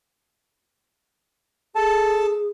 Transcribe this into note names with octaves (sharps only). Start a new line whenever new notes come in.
G#4 A4 A5